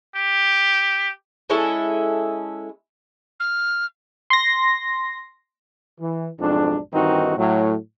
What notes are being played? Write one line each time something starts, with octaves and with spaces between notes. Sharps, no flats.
G4
G#3 C#4 E4 A4
F6
C6 A#6
E3
B1 F2 G#2 D4
G2 D#3 E3 C4 D#4 F#4
A2 F#3